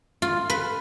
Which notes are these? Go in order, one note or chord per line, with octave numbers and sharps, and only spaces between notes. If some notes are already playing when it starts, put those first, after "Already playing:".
F4
B4